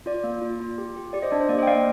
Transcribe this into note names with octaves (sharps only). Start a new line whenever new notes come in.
F4 D5
A#3
F4
F4
G4
G4
G4 D5
C5 D#5
D4 D5
C5
A#3 D5
C5 D#5
G5
A#3 D5 F5